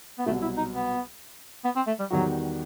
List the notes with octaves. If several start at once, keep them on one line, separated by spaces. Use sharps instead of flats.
B3
C2 B2 F#3 A3
E4
D#4
B3
B3
C4
A3
G3
E2 D#3 F#3 G3 D#4 F#4